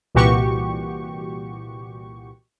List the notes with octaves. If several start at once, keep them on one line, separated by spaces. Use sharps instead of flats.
C2 A#2 E3 F#4 G4 C#6